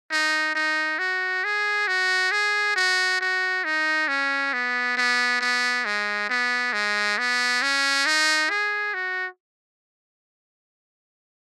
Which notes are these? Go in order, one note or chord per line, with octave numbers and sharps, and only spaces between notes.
D#4
D#4
F#4
G#4
F#4
G#4
F#4
F#4
D#4
C#4
B3
B3
B3
G#3
B3
G#3
B3
C#4
D#4
G#4
F#4